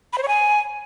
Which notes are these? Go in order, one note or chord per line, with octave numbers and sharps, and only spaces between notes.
B5
C5
C#5
G#5